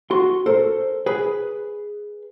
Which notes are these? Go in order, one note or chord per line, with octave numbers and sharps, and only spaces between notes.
F#4 C6
A4 A#4 C5
G#4 B4